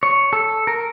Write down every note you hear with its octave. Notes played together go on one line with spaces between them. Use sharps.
C#5
A4
A#4